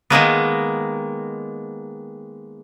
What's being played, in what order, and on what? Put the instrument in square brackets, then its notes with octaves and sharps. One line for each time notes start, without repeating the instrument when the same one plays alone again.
[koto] D#3 G#3 A#3 B3